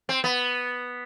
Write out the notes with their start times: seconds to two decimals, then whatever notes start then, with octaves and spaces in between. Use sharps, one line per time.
0.09 C4
0.24 B3